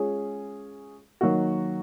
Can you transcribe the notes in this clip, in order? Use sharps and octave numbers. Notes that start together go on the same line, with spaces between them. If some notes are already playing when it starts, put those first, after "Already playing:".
Already playing: G#3 C#4 F4 G#4
D#3 F#3 A#3 D#4 F#4